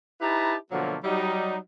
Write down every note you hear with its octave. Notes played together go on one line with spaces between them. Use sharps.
D#4 E4 G4 B4 A5 A#5
B2 D3 F3 F#3 A3 A#3
F#3 G3 D#4